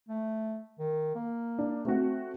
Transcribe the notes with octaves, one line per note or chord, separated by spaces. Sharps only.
A3
D#3
A#3
D4
A3 C4 F#4